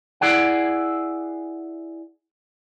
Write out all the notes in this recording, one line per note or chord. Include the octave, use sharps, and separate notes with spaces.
E4 G#4 D5 F#5